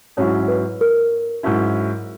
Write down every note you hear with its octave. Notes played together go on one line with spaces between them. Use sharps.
G#2 F#3 C#4 E4 C#5
B4
A#4
G#2 F#3 C#4 E4